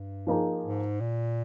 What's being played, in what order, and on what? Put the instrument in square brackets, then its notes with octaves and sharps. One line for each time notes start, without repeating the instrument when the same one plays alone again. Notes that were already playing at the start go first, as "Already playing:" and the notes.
Already playing: [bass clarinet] G2
[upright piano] F3 A#3 D#4 G#4
[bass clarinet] G#2
A#2